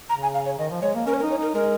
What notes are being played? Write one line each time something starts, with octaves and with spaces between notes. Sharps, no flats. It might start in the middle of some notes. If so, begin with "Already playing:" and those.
C#3 A#5
G#5
F5
C#5
D#3 D#5
F3
G#3 C#5
A#3
C#4 A#4
C#5
A#4
D#4
C#5
D#4 A#4
G#3 A#4